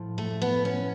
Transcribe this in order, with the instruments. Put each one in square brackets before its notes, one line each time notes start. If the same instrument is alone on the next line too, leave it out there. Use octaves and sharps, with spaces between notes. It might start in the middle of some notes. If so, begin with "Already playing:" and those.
Already playing: [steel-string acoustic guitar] A2 F3
A3
B3
C#4